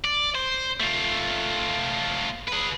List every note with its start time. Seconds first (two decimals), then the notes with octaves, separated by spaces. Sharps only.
0.04 D5
0.35 C5
0.80 A3 F4
2.48 G#4 B4